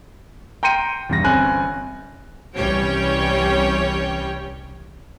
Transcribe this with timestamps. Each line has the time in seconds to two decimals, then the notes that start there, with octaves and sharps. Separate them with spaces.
0.63 G5 A#5 C6 G6 C#7 D#7
1.09 E2 G2 A#6
1.24 G1 C4 C#4 G#5 F#6
2.56 C2 E3 G3 C#4 C#5 G5